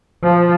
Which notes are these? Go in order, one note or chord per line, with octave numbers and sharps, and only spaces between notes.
F3